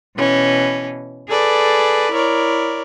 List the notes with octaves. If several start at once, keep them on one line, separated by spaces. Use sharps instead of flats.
B2 E3 C#4
G#4 A4 B4 D5
E4 A#4 C#5 D5